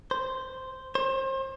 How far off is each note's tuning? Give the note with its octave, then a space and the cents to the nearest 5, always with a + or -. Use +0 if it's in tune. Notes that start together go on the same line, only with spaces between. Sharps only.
C5 -5
C5 +35